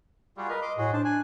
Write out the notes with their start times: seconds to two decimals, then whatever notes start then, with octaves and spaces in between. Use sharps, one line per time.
0.37 G3 F4 F#4 G#4
0.49 A#4 B4 D#5
0.62 D#5 C6 D6
0.78 A2 F#4 G#4
0.93 D4 C5 A5
1.05 G#5 F#6